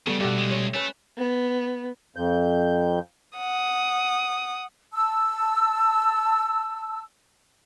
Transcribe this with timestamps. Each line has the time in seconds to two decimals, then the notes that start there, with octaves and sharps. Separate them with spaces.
0.07 C#3 G3 A3 B3
0.20 G2 B2 G3 G4 A4 F#5
0.38 C#2 G#3
0.51 C#5
0.74 A3 C#4 B4
1.18 B3
2.16 F2 G6
3.38 F#5 D#6
4.93 A5 E6